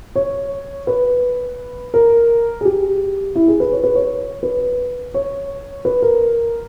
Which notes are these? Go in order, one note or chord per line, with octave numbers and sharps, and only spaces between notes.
C#5
B4
A#4
G#4
G4
E4
G#4
B4
C#5
B4
C#5
B4
C#5
B4
A#4